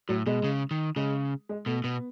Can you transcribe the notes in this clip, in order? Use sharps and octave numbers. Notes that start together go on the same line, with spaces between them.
A2 F#3
B2 G#3
C#3
D#3
C#3 G#3
G#3
B2 A3
B2 B3